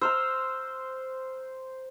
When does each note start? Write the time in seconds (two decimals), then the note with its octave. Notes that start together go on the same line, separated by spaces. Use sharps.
0.02 C5 A#5 E6 F6